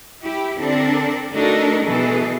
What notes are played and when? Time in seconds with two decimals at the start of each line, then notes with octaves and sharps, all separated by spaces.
0.23 E4 G4
0.58 D3 C4 D4 A4 A#4 D5
1.32 A3 D4 D#4 F#4 A4 A#4
1.84 B2 E3 G#4 A4